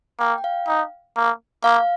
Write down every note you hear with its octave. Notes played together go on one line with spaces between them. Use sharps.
A#3 G5
G5
F5
D#4
A#3
A#3 F5